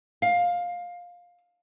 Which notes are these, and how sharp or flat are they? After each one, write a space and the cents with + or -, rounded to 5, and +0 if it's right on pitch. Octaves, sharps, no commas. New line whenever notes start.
F5 +15